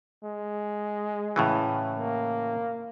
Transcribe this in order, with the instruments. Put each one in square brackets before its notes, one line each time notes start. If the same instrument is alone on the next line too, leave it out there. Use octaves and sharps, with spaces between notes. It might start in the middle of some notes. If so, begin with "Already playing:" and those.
[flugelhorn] G#3
[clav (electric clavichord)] A2 C#3 E3
[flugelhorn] A#3